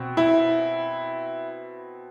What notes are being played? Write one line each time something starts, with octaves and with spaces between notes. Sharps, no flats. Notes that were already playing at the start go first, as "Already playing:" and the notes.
Already playing: B2 C4
E4